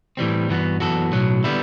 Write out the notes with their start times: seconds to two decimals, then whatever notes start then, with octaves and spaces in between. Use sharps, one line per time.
0.17 A2 E3 G3 C4
0.50 G2 E3 B3 F#4
0.80 F#2 E3 B3 F#4 A4
1.12 B1 A2 F#3
1.44 D3 G3 B3 E4